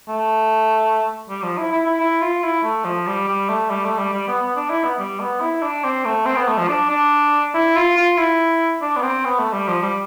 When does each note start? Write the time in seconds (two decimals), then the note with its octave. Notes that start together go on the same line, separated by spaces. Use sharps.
0.09 A3
1.30 G3
1.43 F3
1.58 E4
1.72 E4
1.87 E4
2.00 E4
2.22 F4
2.43 E4
2.64 A3
2.85 F3
3.07 G3
3.28 G3
3.49 A3
3.70 G3
3.85 A3
3.98 G3
4.13 G3
4.28 B3
4.42 B3
4.56 D4
4.70 E4
4.84 B3
4.99 G3
5.20 B3
5.41 E4
5.62 D4
5.84 C4
6.05 A3
6.26 C4
6.36 B3
6.48 A3
6.58 F3
6.68 D4
6.90 D4
7.54 E4
7.76 F4
7.97 F4
8.17 E4
8.82 D4
8.96 B3
9.03 C4
9.25 B3
9.39 A3
9.53 G3
9.68 F3
9.82 G3